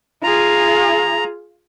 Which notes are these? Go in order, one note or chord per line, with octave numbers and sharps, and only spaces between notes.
F4 G#4 A#5